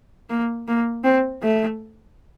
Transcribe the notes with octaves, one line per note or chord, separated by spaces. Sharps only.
A#3
A#3
C4
A3